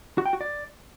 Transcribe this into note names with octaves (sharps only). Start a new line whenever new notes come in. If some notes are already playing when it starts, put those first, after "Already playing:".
F#4
G5
F#4
D5